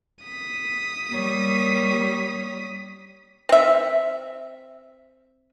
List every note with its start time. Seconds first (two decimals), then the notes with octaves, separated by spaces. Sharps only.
0.23 D#6 B6
1.10 G3 A#3 C#5
3.49 C4 E5